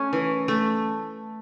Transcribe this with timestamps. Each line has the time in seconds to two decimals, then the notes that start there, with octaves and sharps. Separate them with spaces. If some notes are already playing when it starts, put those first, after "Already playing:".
Already playing: A3 C#4
0.13 E3
0.48 A3